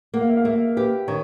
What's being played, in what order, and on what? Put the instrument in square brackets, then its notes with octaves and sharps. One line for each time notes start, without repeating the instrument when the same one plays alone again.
[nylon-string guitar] A#3 [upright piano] F#5
[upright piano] F5
E5
F5
[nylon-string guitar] A#3 [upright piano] E5
[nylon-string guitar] G4 [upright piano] B4
[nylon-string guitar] D#3 [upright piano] C#5